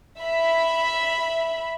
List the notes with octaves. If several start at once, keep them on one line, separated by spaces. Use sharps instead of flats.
E5 B5